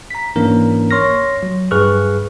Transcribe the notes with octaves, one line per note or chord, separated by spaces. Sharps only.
A#5 B6
G#2 E3 A#3 C#4 D4 A#4
C#5 C6 C#6 F6 A#6
F#3
G2 G#4 B4 C#6 F6 F#6